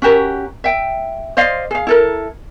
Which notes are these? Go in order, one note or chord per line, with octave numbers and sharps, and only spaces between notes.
C#4 F#4 G4 A#4
E5 G5
C5 D5 D#5 F5
G#4 F5
E4 A4 A#4